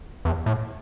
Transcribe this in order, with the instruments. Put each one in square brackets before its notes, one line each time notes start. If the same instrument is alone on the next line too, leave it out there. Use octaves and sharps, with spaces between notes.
[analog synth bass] E2
A2